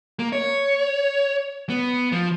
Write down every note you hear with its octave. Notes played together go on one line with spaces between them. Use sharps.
A#3
C#5
B3
F3